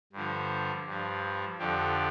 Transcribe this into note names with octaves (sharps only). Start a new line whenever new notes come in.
G2 D3 F3
G2 F3
F2 D3 F3 G4